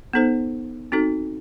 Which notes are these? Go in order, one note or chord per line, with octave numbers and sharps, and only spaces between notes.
B3 D#4 A4 C5
C4 D#4 F#4 A4